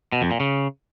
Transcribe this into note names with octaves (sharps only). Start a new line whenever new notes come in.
B2
F2
A#2
C#3